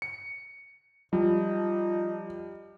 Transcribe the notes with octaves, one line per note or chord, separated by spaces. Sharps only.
C#7
F3 G3 D#4